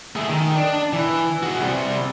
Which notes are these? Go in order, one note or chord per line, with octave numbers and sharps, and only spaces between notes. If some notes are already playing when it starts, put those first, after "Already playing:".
A3 G#4
D#3
D4
E3
F#4 G#4
C3 G3